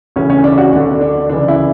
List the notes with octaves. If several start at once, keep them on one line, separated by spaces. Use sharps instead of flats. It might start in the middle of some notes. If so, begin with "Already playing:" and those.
D2 C#3 E3 C#4
C#4
D4
F#4
D2 D3 D4
D4
C#2 C#3 E3 D4
E4